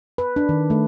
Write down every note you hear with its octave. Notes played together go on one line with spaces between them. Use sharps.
B4
D4
D#3
A3